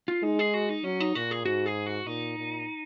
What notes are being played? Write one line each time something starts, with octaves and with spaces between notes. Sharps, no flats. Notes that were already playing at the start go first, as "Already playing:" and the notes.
F4
G#3 D#4
G#4
F#4
D#4
F#3 C#4
D#4
A#2 F#4
G#4
G#2 F#4
G#4
F#4
A#2 D#4
A#2